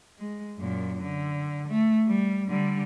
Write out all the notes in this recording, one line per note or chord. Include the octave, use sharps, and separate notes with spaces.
G#3
F#2 A#2
D3
A3
G3
D3 G3